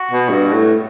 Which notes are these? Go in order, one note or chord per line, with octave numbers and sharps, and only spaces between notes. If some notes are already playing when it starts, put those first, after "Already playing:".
Already playing: F#4
B2
G2
A2